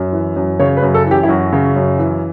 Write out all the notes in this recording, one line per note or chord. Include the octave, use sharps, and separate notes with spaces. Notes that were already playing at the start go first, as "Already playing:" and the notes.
Already playing: F#2
E3
F#2
C#3 C#5
B4
F#2
A4
E3 G4
E4
F#2 F#4
C#3
F#2
E3